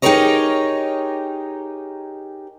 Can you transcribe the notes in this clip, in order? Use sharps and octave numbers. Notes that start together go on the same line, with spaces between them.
D#4 G4 G#4 A#4 C#5 D#5